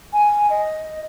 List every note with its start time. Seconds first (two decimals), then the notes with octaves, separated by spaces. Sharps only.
0.13 G#5
0.50 D#5